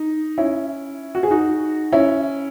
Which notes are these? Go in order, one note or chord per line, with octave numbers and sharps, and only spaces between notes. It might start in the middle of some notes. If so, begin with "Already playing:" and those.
Already playing: D#4
C#4 E4
F#4
G#4
D#4 F#4
C#4 E4